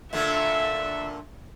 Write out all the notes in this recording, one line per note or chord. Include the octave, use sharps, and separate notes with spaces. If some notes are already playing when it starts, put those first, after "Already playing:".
A#2 D3 A3 E5